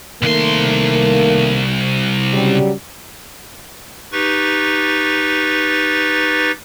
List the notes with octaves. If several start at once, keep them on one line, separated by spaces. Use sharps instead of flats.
C2 D#3 A3 A#3 C6
C#3 F#3 G3
D#4 G4 B4 C#6 A6